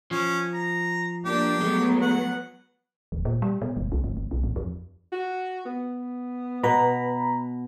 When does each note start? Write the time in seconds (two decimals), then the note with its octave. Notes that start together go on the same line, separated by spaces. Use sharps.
0.11 F3 C#4
0.54 A#5
1.25 A#3 D4 G4
1.61 F#3 G#3 A3 B3
2.02 F#5
3.12 D#1
3.25 A#2
3.42 G3
3.62 B2
3.77 F#1
3.92 C2
4.04 G1
4.17 G1
4.31 B1
4.44 A1
4.56 F2
5.12 F#4
5.65 B3
6.63 B2 B4 A#5 B5